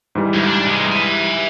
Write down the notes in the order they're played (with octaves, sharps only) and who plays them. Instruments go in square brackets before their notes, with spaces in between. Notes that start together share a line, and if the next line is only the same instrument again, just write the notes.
[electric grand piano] G#2 E3 G3
[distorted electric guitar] D2
D4
C3 G#3
E5 G#5